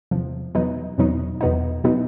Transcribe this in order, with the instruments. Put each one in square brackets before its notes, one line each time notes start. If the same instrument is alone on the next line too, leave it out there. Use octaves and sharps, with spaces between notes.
[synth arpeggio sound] E2 C3 F3
E2 B2 F#3 B3 D#4
E2 B2 F#3 B3 D#4
E2 B2 F#3 B3 D#4
B2 F#3 B3 D#4